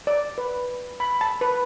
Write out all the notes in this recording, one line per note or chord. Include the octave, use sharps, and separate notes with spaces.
D5
B4
B5
A5
B4